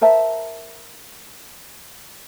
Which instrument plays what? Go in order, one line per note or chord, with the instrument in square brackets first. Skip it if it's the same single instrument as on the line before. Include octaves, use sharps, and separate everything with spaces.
[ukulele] A#4 C5 E5 A5